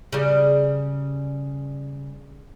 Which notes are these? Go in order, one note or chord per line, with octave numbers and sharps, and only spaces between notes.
C#3 G3